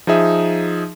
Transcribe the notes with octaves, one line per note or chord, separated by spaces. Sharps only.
F3 D#4 G#4 E5